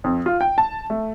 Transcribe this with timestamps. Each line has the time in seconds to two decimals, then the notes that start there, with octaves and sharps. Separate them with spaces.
0.04 F2
0.26 F4
0.41 G5
0.58 A5
0.90 A3